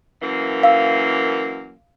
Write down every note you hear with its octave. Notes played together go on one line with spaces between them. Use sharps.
F#2 E3 A#3
F5 E6